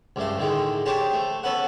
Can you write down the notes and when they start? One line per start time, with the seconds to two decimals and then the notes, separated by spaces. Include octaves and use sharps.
0.16 C#2 G2 A3 C6
0.39 A2 D3 D#3 G#3
0.86 D4 G4 G#4 C5 C#5 A5
1.13 A3
1.43 B3 C#4 A4 B4 F#5